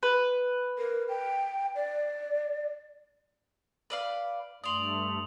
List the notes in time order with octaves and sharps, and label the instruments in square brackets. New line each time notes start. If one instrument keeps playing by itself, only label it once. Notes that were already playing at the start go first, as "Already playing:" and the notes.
[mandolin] B4
[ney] A#4
G5
D5
[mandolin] B4 D5 F5
[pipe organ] G2 A3 [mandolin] D5 C6 [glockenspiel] D#6 F7 F#7